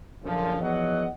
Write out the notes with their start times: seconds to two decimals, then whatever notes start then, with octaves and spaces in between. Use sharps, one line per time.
0.23 F#1 F#2 A#2 D3 F3
0.61 E2 F3 F#3 D#5 F#5